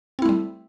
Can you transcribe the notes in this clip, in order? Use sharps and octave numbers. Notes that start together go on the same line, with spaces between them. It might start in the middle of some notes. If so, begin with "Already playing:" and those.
G3 A3 C4 E4